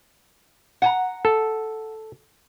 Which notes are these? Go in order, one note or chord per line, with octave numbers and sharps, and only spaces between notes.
F#5 G#5 A#5
A4